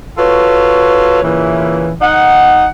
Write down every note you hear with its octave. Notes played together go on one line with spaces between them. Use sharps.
F4 F#4 A4 B4 C#5
A#2 C#3 E3
D#3 D#4 F#5